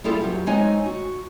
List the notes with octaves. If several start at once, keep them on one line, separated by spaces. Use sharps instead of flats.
G3 E4 F4 G#4 A4
E2 F#3 G4
G#3 C4 D#4 C#5 D#5 G#5
F#4